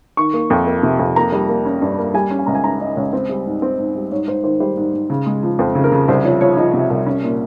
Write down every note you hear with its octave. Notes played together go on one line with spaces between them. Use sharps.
D#3 C#6
A#3
F2
A#3
C3
F2
A#3 A#5
G3
A#3
C#4
G2
A#3
G3 G#5
C#4
G#5
C#2 A#5
G#5
C#4 A#5
C#4 D#5
C#2 C#5
C4
G3
G#2
C4
G#2
G3
G#2 C#5
G#2 C5
D#3 C5
G3 C5
G#2
G#2
C#3
G#3
F3
F2 C5
C#3
A#4
C#3
C2 C5
F3 C#5
F3 C#5
F3 D#5
C3
C2
C#4
A#2